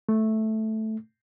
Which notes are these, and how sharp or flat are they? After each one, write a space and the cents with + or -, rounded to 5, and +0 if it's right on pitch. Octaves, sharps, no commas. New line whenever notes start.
A3 -5